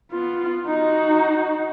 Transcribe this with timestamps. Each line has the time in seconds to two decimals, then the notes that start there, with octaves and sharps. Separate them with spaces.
0.12 B3 F4
0.67 D#4 F#4